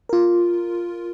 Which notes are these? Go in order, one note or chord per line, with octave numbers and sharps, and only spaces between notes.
F4 A#4